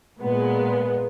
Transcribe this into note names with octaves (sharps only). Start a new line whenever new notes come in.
A#2 G#3 B3